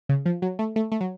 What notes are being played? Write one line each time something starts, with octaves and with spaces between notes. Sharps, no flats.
C#3
F3
F#3
A3
A3
A3
F#3